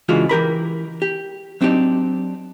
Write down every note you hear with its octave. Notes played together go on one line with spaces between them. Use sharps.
C#3 E3 G#3 D4 F4 F#4
E3 G4 A#4 B5
G4
F#3 C4 D4 D#4 G4